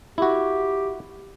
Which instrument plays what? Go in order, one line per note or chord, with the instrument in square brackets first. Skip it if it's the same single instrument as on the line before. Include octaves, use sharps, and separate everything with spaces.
[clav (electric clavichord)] E4 F#4 [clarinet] G4